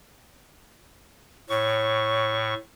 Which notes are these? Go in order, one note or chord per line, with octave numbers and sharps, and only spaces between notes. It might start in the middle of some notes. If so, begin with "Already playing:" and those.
A2 C#5 C#6